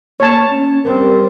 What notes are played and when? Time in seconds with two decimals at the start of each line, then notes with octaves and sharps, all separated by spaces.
0.20 A#3 C#5 A5
0.50 C#4
0.84 G3 C4 A#4